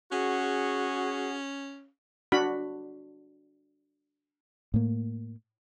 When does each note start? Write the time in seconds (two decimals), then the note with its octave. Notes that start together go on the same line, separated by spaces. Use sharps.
0.12 C#4 F#4 G#4
2.32 D4 F#4 B5
4.74 A2 A#3